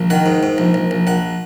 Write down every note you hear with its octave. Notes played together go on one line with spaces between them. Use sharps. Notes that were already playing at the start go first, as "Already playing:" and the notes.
Already playing: A#1
D#3 F#5
G#2
G#2
A#1
A#1
A#1
A#1 F#5